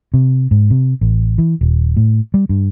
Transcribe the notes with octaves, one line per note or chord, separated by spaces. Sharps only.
C3
G#2
C3
A1
E3
D#1
A2
G3
G2